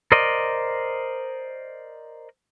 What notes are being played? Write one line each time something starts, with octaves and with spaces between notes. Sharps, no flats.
A#4 C5 D5 D#5